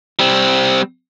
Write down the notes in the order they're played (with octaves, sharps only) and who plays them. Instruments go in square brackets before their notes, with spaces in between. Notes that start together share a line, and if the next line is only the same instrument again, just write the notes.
[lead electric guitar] G3 C4